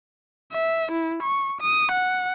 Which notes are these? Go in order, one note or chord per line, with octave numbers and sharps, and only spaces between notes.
E5
E4
C#6
D#6
F#5